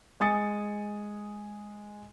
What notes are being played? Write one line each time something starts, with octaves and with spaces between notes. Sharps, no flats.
G#3 G#5 D#6 A6 C#7